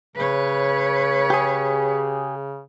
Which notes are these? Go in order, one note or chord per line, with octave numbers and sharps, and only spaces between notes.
C#3 B4 C#5
G4 G#4